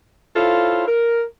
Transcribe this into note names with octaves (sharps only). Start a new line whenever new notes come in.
E4 F4 A4 C5 C#5 F5
A#4